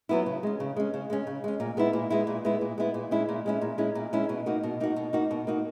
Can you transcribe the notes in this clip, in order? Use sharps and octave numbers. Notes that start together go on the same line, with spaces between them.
F#3 B3 E4
C#3
G#3 C#4
C#3
G#3 C#4
C#3
G#3 C#4
C#3
G#3 C#4
A#2
G#3 B3 E4
A#2
G#3 B3 E4
A#2
G#3 B3 E4
A#2
G#3 B3 E4
A#2
G#3 C#4 E4
A#2
G#3 C#4 E4
A#2
G#3 C#4 E4
A#2
G#3 C#4 E4
B2
A#3 D#4 F#4
B2
A#3 D#4 F#4
B2
A#3 D#4 F#4
B2
A#3 D#4 F#4